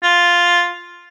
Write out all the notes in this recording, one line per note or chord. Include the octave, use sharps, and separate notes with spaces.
F4